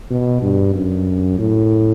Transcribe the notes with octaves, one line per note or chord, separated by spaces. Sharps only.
B2
G2
F#2
A2